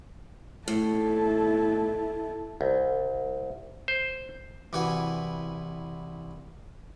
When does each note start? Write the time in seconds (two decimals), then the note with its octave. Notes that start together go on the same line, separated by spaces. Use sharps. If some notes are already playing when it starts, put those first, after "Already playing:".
0.68 A2 E4 A4
2.61 C2
3.88 C5
4.73 C2 E3 F#4 B4 G#5